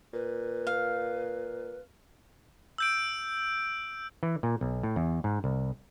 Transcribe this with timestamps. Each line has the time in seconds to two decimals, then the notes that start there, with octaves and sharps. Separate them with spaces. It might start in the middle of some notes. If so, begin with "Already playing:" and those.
0.14 A#2 B4
0.67 F5
2.78 E6 G6 D7
4.23 E3
4.43 A#2
4.61 B1
4.83 A2
4.96 E2
5.24 G#2
5.44 C2